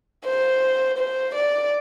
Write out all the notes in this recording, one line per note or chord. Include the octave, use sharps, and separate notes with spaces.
C5
C5
D5